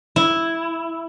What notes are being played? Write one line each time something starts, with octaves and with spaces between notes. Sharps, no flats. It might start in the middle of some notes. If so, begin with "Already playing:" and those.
E4